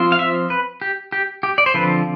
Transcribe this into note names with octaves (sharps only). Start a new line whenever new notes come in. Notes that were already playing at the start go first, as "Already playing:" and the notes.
Already playing: F3 C4 F4
F5
E5
B4
G4
G4
G4
D5
C5
D3 F3 C4 F4 B4